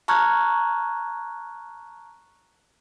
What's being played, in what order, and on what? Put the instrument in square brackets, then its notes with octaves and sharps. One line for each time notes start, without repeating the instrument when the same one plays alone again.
[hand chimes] A5 A#5 C#6 F6 F#6 G#6